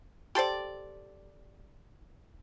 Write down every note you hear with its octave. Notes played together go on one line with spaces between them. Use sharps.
G4 A4 C5 D5